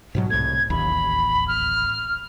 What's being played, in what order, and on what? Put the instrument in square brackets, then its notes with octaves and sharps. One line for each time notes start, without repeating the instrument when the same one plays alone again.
[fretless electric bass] G#2 B2 F#3
[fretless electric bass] C2 A2 [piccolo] G#6
[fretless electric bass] D1 A1 D#2 [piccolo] B5
[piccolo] F6